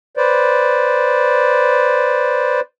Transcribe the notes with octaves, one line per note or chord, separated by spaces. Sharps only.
B4 C5 D5